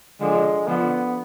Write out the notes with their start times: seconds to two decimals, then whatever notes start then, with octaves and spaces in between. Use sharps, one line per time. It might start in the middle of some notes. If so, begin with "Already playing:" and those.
0.20 D3 F3 G#3
0.67 D3 F3 B3